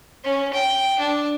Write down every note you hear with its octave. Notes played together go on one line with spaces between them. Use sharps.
C#4
G5
D4